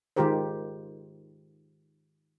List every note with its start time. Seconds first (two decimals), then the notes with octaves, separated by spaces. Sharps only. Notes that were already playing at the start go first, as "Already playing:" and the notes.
0.16 D#3 G#3 F4 G4 A#4 C5